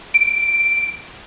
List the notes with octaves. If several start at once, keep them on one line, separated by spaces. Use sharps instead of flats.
D7